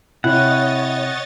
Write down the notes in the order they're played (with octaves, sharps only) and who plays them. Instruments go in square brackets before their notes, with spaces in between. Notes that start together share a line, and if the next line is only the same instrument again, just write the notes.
[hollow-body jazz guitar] C3 [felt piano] E4 [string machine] C#5 D#5 A6 [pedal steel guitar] F#5